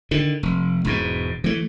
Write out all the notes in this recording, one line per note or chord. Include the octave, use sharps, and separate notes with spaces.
D3 D#3
F1
E1 G#2 B2
E3 A3